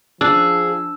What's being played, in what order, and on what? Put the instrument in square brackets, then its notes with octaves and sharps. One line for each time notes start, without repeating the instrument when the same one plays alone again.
[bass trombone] F3 [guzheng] D4 [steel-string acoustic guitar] G#4 [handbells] E6